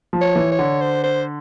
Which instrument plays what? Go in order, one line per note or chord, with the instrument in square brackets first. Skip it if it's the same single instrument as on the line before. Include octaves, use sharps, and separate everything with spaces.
[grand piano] F3
[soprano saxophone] C#5
[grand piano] E3
[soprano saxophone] C#5
[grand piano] D3
[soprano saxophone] C5
C5